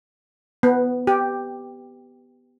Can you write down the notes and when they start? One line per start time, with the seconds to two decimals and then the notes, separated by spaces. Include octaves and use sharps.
0.63 B3
1.07 G4